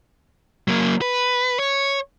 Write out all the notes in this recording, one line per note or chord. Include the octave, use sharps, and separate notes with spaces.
F#3 A#3
B4
C#5